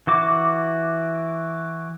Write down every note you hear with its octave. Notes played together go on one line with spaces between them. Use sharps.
E3 F#4 D6